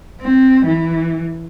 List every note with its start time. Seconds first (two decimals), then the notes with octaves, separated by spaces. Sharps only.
0.21 C4
0.66 E3